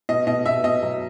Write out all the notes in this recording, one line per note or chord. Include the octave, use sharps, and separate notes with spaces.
B2 D#5
B2 D#5
B2 E5
B2 D#5
F#3